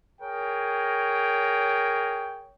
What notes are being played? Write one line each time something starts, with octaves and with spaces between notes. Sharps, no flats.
G#4 A#4 C#5 G5